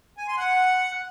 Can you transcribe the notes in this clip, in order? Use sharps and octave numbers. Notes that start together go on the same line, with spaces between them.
G#5
C6
F#5